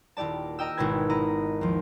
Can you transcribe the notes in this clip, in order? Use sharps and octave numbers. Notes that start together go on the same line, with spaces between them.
D#1 E4 G4 D5 A5
A#4 D#5 G5 E6
G#1 B2 E4 B4 G#6
B3 E4 D#5 A#5
D#2 F3